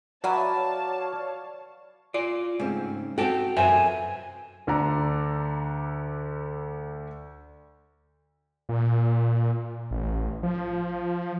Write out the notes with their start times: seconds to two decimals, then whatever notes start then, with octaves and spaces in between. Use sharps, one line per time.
0.24 F#3 E4 B4 C#5 D5 F5 G#5 A5
2.14 F4 D5
2.60 G#2 C#3 A3 C4
3.18 C4 D#4 F#4 A4 G5
3.57 F#2 C3 B4 C5 E5 G#5
4.67 D2 D3 D5 A#5
8.69 A#2
9.91 A1
10.43 F3